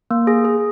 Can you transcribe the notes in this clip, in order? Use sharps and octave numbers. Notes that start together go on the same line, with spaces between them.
A#3
G#4
G#4